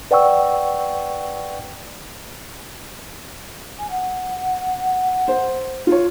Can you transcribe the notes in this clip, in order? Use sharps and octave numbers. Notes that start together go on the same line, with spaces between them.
B4 D5 F#5 G5 C#6 E6
G#5
F#5
C5
F4 C#5